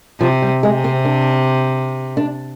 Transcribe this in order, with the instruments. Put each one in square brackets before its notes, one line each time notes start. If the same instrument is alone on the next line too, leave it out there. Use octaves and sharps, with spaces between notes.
[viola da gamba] C3 [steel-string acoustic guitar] F3
[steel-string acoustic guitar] G3
[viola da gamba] C3 [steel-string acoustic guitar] G#3
[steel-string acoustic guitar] C4
D4
D4